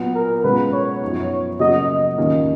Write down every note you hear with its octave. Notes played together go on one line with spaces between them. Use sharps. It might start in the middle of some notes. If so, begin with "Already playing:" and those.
Already playing: A#2 F#3 B3
A#4
B2 G#3 C#4 F4 B4
C#5
F#2 F3 B3 D#4
C#3 F#3 A#3 D#5
D#5
D#2 D#3 A#3 C#4 F4